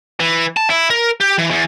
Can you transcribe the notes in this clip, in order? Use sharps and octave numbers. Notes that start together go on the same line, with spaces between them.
E3
A5
E4
A#4
G4
E3
E2